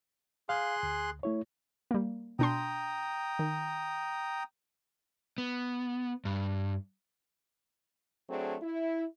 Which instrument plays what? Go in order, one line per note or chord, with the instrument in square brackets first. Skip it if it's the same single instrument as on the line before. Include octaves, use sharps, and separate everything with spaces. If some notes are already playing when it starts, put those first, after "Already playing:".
[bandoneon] G#4 C6 F#6 [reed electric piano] F5
[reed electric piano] D2
A3 E4 C#5
[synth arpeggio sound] G3 A#3
[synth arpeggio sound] B2 D4 C6 [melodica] G5 A#5 D#6
[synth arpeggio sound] D#3
[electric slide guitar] B3
G2
[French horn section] F#3 A3 C4 D4 G#4
E4